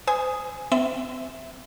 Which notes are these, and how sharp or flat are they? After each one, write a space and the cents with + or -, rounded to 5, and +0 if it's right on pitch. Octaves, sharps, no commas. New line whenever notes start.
C5 -40 G#5 +0 D#6 +0
C4 -40 E5 +0